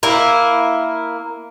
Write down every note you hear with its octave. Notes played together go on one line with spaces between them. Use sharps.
A#3 E4